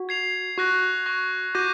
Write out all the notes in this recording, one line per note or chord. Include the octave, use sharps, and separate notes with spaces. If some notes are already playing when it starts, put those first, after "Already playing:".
Already playing: F#4
G#6 C7 F7
F#4 C#6 F#6 A#6
C#6 F#6 A#6
F#4 D6 G6 A#6 D#7